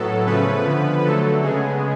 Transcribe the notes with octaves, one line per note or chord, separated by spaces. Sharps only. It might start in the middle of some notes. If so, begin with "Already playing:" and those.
Already playing: A2 F#3 B3 A4
C#3 F3 A3 C#4 B4
D3 F3 B3
D3 F#3 A3 A4
C#3 G#3 B3 G#4